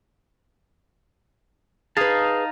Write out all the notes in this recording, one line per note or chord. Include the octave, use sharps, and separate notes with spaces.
D#4 G#4 B4 F5 A5